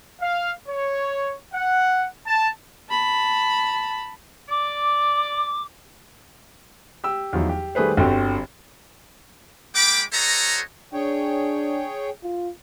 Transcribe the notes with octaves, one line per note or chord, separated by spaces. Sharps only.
F5
C#5
F#5
A5
A5 B5
D5 D6
G4 E6
E2 F3 F#3 D#4
G4
D#3 G3 A3 G#4 B4 C5
G1 D3 C4 F#4 G4 A4
G#3 A#3 G5 B5 D6
F#4 A4 C5 C#5 D#5 A#5
D4 G#4 C#5 G5
F4